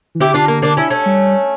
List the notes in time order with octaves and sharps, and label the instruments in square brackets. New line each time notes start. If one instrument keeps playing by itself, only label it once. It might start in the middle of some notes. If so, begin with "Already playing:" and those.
[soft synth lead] E3
[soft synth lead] D3 [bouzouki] E4 G4
[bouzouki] D4 F4
A#3
A#3 D4
C#4 E4
A3 C#4
[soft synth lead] G3